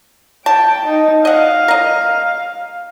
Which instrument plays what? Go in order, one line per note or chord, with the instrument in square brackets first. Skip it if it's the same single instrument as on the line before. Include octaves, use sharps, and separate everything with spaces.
[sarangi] G5 [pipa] A5
[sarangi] D#4
[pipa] D#5 F#5 [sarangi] F5
[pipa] A#4 D#5